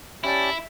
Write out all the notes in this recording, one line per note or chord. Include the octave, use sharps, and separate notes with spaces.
C#4 E4 G4 D5 A5